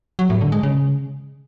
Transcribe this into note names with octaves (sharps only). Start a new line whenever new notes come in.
F#3
A2
D3
G#3
C#3